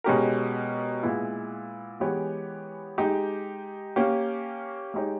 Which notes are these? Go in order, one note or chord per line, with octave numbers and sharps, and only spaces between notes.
B2 G#3 C#4 G4 A#4
A#2 G#3 B3 E4
E3 G#3 B3 G4 C#5
G#3 D#4 G4
A#3 C#4 G4
G#3 D#4 G4 C#5